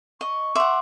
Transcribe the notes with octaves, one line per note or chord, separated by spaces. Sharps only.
D#5 C#6
E5 F#5 C6 D6